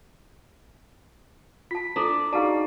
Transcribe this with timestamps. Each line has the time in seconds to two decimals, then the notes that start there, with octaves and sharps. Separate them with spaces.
1.71 F4 A5 B6
1.96 D4 E4 A4 A#5
2.33 D#4 F#4 G#4 D5 F5 A5